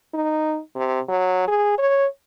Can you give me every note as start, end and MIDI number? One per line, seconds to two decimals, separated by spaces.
0.14 0.59 63
0.76 0.99 48
1.09 1.44 54
1.48 1.75 68
1.78 2.06 73